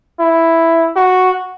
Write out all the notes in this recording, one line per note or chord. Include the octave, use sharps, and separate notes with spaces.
E4
F#4